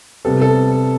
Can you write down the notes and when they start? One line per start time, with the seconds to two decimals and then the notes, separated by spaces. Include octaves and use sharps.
0.25 C3 G3 B3 A4
0.41 A4